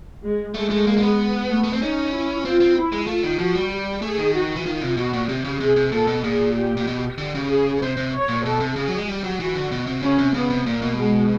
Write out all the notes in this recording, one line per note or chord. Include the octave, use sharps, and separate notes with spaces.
G#3
G#3 A3
A3
A#3
A#3
B3
A3
B3
C4
C#4 D#4
E4
C4 F4
C4
E4
G#3
A3 F4
D#3
F3 F#4
G3
G4
A3 G#4
D#3
F#4
E3
D#3 F4
C3
B2 F#4
A#2
C3 G4
C#3
C3 G#4
C3
A#2 A4
B2
A#2 G#4
G4
A#2
B2
D3 G4
C#3
G#4
C3 C5
C3
C#5
A#2
B2 A4
C3
C#3 G#4
F#3
G#3
G3 G4
F#3
E3 F#4
D3
B2
C3
C#3 C#4
C3
C#3 B3
C3
A#2 A#3
B2
G#3